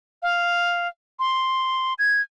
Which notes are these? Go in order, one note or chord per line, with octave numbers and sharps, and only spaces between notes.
F5
C6
G#6